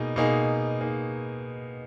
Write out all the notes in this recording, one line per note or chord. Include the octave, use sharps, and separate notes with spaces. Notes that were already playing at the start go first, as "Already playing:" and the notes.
Already playing: B2 A#3 D#4 G#4
B2 A#3 D#4 G#4
A#3 D#4 G#4